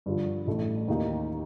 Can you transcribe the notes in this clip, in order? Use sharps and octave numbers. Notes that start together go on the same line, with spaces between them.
G2 D3 F3
A1 A2 A3
D#2 D#3 A#3 D#4